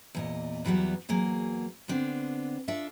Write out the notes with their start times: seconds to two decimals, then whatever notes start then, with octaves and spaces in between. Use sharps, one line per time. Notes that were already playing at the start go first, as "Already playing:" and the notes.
0.15 E2 A#2 D#5
0.65 E2 E3 F#3 G3 B3
1.09 E2 F#3 A#3 G#4
1.88 D3 B3 C4 D4
2.68 D4 F4 A4 E5